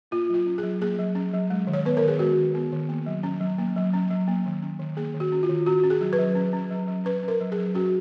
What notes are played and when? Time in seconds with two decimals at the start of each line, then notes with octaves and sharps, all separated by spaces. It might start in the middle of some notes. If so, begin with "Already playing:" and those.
0.11 A#3 F4
0.29 F#3 F4
0.47 C#4
0.58 G#4
0.63 F#3
0.81 A#3 G#4
0.99 F#3
1.15 C#4
1.34 F#3
1.50 G#3
1.67 D#3
1.73 C#5
1.85 B3 B4
1.97 A#4
2.03 D#3
2.08 G#4
2.19 G#3 F#4
2.37 D#3
2.55 B3
2.72 D#3
2.89 A#3
3.06 F#3
3.23 C#4
3.41 F#3
3.58 A#3
3.76 F#3
3.93 C#4
4.10 F#3
4.28 A#3
4.46 D#3
4.62 C#4
4.79 D#3
4.97 A#3 G#4
5.14 D#3
5.20 F#4
5.32 C#4
5.43 F4
5.49 D#3
5.66 C#4 F#4
5.83 C#4
5.90 G#4
6.01 F#3
6.13 B4
6.19 F#3
6.35 C#4
6.53 C#4
6.71 F#3
6.87 F#3
7.05 C#4 B4
7.23 C#4 A#4
7.41 F#3
7.52 G#4
7.58 F#3
7.75 C#4 F#4